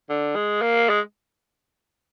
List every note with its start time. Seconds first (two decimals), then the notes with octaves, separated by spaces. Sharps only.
0.09 D3
0.35 G#3
0.62 A#3
0.89 G#3